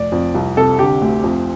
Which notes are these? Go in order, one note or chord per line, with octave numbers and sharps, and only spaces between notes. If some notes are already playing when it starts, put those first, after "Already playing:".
Already playing: F1 D5
F2
C2
C3 A4
D3 G4
D2
F2